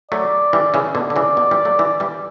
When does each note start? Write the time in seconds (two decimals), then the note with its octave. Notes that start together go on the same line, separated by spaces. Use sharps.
0.11 F#3 A3 D5
0.53 E3 G3
0.74 C#3 E3
0.95 B2 D3 D5
1.10 D3
1.16 C#3 E3
1.37 B2
1.51 E3 G3
1.65 F#3 A3
1.79 E3 G3
2.00 E3 G3